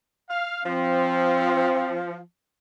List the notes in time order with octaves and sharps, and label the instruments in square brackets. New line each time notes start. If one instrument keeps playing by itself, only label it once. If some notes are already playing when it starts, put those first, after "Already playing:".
[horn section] F5
[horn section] F3 [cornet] C4